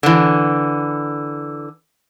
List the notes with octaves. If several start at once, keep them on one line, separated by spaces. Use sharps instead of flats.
D3 E3